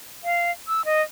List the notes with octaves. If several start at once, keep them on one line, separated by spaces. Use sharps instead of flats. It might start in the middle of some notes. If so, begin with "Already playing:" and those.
F5
E6
D#5